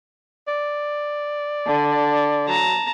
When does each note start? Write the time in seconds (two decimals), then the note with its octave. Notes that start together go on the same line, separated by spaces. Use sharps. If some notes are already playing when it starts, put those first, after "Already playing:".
0.48 D5
1.67 D3
2.48 F#3 A5 A#5